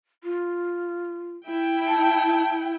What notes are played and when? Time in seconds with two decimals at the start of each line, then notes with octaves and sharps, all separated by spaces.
0.24 F4
1.46 E4 G5
1.88 A5